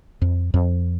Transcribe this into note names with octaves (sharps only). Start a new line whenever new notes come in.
F2
F2